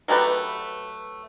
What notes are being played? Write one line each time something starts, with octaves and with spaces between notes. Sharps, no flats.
F#3 A3 G4 B4